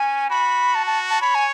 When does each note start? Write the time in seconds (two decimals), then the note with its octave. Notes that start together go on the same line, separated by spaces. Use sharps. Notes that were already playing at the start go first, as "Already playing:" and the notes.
Already playing: C#4 G#5
0.30 F#4 B5
0.75 A5
0.87 A5
1.10 A5
1.21 C#5 B5
1.35 G#5